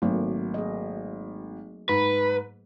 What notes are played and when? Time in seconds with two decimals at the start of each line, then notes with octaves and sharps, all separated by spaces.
0.02 G#1 F#3 A3 A#3
0.54 G#4 D#5
1.89 G#2 B4